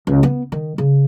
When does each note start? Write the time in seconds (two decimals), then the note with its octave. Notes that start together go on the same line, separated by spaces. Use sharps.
0.07 C#2
0.23 B3
0.52 D#3
0.78 C#3